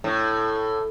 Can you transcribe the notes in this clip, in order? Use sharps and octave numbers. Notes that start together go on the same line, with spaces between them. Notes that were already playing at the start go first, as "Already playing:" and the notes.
A2